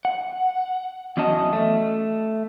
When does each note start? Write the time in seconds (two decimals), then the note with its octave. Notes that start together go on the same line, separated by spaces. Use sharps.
0.05 F#5
1.17 E2 F#3 C#4 D#5 A5
1.53 A3